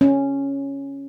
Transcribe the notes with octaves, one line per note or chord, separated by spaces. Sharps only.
C#4